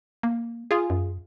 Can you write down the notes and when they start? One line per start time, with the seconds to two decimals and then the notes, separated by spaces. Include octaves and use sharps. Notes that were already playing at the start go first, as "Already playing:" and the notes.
0.23 A#3
0.71 F4 G#4
0.90 F#2